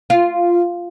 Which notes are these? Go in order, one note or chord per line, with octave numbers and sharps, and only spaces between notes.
F4